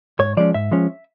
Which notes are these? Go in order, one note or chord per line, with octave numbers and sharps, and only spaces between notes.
G#2 C#5
F3 G#3 C#4 D5
G#2 E5
F3 G#3 C#4